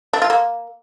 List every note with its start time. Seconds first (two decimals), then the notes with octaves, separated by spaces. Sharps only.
0.13 D4
0.22 F4
0.30 A#3